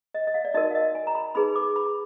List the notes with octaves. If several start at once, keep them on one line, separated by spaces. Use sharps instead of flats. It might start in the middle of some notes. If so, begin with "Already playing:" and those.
D#5
D#5
F5
D5
D#4 F#4 A#4 D#5
F5
D#5
G#5
A#5
B5
D#4 G#4 B4 B5
D6
B5